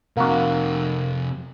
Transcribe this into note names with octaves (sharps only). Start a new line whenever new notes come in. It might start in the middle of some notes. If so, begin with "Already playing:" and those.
F2 C3 A#3 F#4